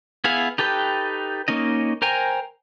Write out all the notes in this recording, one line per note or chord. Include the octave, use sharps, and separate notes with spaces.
B3 E4 G#4 F5
D#4 G4 A4 B4 G5
A#3 C#4 D#4 D#5
A#4 C5 G5 G#5 A#5